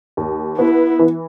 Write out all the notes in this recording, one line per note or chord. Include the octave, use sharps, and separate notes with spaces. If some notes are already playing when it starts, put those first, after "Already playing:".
D#2
B3 E4
E3